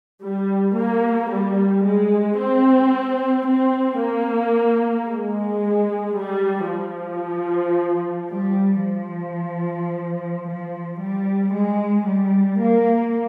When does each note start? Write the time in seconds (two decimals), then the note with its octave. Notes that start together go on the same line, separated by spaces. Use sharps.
0.22 G3
0.75 A#3
1.29 G3
1.84 G#3
2.38 C4
3.45 C4
3.99 A#3
5.07 G#3
6.15 G3
6.69 F3
8.30 G3
8.83 F3
10.46 F3
10.99 G3
11.53 G#3
12.07 G3
12.61 A#3